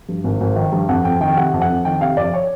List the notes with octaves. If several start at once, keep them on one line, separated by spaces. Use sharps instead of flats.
G2
G#1
G#1
D#3
G2
F2 F#5
F2 G5
D#3 G5
C3 F#5
F2
F#5
F2
D#3 G5
C3 F5
F2 D5
C#5